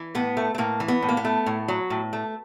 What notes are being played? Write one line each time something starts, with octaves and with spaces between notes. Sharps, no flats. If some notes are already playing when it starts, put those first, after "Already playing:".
Already playing: E3
A2 B3
A3
A3
A2 A#3
E3
B3
A2
A#3
B3
A3
A2
F#3
A2
A3